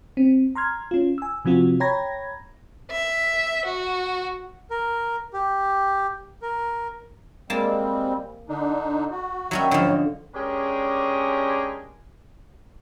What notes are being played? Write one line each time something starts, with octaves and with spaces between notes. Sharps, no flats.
C4
A#5 C6 F6 G#6
C#4 F4
G#5 E6
C3 F3 C4 F4 F#4
C#5 G5 A#5 B5 G#6 A#6
E5
F#4
A#4
G4
A#4
G3 G#3 A#3 C4 A5
D3 D4 D#4
F#4
D#3 F#3 G3 C#4 E5
G#2 D3 F3 C#5 D#5
G#3 C#4 D4 G4 G#4 A#4